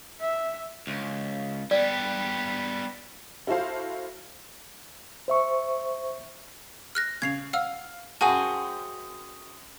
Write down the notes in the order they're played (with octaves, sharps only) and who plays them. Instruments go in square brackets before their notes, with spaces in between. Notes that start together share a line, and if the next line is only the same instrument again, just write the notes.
[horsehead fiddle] E5
[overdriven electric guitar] C#2
[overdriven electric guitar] G3 B3 [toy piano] D5
[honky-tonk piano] E4 F#4 A4 C5 F5
[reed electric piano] C5 E5 C#6
[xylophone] F6 F#6 A#6
[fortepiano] C#3 [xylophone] G#6 C7 F7
[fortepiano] F5 [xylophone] F#5 E6 F6
[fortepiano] F#2 G5 [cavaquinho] F#4 G#4 C5 [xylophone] A5